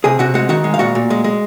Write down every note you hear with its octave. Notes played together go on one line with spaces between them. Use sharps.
C3 G#4 G#5
C3 F#4 F#5
G#3 F#4 F#5
D#3 F#4 F#5
G#3
F5
A#2 F#4 F#5
A#2
G#3
G#3